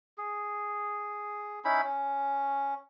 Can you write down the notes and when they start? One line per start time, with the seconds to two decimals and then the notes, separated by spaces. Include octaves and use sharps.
0.18 G#4
1.65 C#4 D#4 E4 B5
1.84 C#4